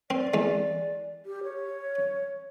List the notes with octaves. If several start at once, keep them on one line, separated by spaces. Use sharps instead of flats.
C4 D5
E2 G#3
G4
C#5